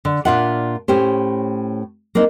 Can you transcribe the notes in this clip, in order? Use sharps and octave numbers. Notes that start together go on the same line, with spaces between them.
D3
A#2 F#3 D4 F4 E5 F#5
A2 C#4 G4 C5
A#3 C4 D4 D#4